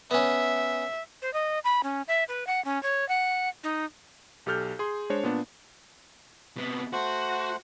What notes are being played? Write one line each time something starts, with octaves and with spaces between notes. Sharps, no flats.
B3 C#4 E5
C5
D#5
B5
C#4
E5
B4
F#5
C#4
C#5
F#5
D#4
B1 G4 A4 F6 G6
G#4 C6
G#3 D4 C5 C#5
A#2 B3 D4
C3 B3
A3 F#4 C5 F#5